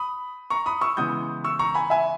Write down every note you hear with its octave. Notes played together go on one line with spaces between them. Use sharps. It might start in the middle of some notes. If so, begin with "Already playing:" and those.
Already playing: B5 D#6
A#5 C#6
B5 D#6
C#6 E6
C#3 E3 G#3 B3 D#6 G6
C#6 E6
A#5 C#6
G#5 B5
E5 G#5